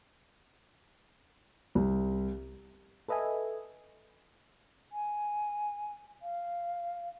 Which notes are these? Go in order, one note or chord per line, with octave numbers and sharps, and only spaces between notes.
C2
A4 B4 D#5 E5 G#5
G#5
F5